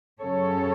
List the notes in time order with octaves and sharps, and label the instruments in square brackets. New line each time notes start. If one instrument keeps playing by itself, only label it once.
[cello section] F#2 C#3 F#3 C#4 A4 C#5